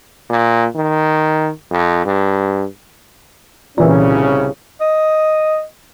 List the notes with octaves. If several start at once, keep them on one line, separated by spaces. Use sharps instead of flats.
A#2
D#3
F2
G2
C2 A#2 C#3 E3 C#4
D#5